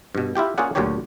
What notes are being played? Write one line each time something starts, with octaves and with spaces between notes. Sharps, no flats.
G2 B2
E4 F4 G4 G5
A#3 C#4 F4 G#4 D5 F#5
D2 A#2 D3 F#3 G4 C#5